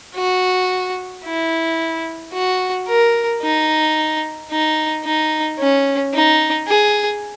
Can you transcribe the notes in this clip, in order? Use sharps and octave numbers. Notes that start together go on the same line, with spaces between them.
F#4
E4
F#4
A#4
D#4
D#4
D#4
C#4
D#4
G#4